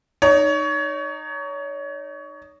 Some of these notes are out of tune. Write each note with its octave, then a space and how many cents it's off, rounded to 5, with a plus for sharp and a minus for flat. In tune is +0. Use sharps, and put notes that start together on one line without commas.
D#4 -20 C#5 +25